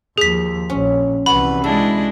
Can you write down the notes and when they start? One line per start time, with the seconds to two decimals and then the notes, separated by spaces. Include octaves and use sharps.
0.18 D#2 F3 G#4 B6
0.70 A#1 C#4
1.26 C2 E3 F#4 B4 B5
1.64 G#3 D4 E4 A4